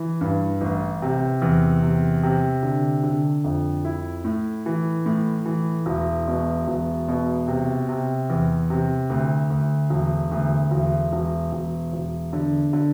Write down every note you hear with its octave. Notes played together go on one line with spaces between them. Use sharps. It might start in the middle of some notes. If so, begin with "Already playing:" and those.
Already playing: E3
G2
A1
C3
E2
C3
C3
D3
D3
F2
E4
A2
E3
A2
E3
E1
B2
E1
B2
C3
C3
E2
C3
D2
D2
E1
D2
E1
E1
E1
E1
D3
D3